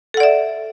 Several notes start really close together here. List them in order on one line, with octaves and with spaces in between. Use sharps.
A4 F#5 D5 E5